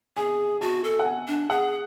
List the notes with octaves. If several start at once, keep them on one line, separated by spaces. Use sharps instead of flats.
G#4 G#5
F#4 A5
A4
F#5
G#5
D4
G#4 F#5